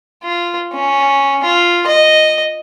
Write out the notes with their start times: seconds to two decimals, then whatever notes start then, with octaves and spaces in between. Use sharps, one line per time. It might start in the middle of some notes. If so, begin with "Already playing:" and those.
0.24 F4
0.73 C#4
1.44 F4
1.87 D#5